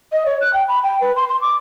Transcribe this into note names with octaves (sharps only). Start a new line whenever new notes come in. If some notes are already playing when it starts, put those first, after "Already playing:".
D#5
C#5
F#6
G5
B5
G5
B4
C6
C6
D6